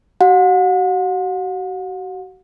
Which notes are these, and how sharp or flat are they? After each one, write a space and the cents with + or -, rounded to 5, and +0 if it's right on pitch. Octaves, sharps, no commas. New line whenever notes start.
F#4 +40 F#5 -40